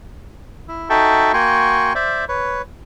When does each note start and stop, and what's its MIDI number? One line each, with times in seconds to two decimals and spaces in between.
0.68 0.89 64
0.90 1.32 63
0.90 1.32 66
0.90 1.32 69
0.90 1.32 76
0.90 1.32 79
0.90 1.32 81
1.33 1.93 58
1.33 1.93 66
1.33 1.93 79
1.33 1.93 80
1.33 1.93 84
1.33 1.93 85
1.95 2.25 72
1.95 2.25 74
1.95 2.25 76
2.29 2.62 71
2.29 2.62 73